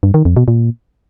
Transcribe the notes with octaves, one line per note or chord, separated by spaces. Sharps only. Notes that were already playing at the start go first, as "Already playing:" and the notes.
G2
D#3
F2
B2
A#2